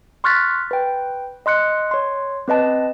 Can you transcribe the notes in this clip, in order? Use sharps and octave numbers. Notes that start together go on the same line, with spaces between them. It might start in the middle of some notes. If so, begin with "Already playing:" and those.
C6 C#6 F6 F#6 A6 B6
B4 G5
D#5 C6 F#6 C#7
C#5 C6
C4 B4 D#5 A5